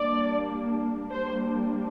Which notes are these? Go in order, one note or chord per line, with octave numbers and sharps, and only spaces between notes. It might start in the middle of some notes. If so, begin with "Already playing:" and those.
Already playing: G3 A#3 D4 D5
G3 A#3 D4 C5